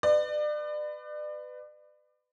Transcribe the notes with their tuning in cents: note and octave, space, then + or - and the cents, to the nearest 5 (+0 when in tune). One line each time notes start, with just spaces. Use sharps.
B4 +25 D5 +35